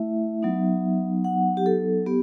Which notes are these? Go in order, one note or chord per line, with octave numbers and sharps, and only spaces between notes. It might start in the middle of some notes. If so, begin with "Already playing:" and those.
Already playing: A3 E4 E5
F#3 B3 D#4
F#5
G4
A4
B3 G4